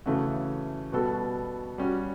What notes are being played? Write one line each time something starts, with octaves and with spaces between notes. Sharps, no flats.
C#3 E3 A3 C#4 F#4
B2 G3 B3 F#4 A4
G3 C#4 F#4